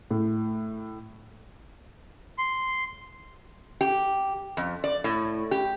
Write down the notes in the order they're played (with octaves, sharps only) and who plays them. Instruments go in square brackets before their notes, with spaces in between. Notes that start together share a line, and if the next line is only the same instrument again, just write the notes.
[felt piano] A2
[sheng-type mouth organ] C6
[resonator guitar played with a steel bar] G4
F2
D5
A2
G4